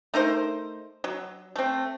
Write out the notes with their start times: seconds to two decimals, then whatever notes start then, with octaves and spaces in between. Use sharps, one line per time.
0.14 A3 D#4 A#4 C5
1.04 F#3
1.56 A3 C4